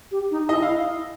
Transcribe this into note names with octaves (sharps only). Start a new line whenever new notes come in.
G4
D#4
E4 D#5
E4 F5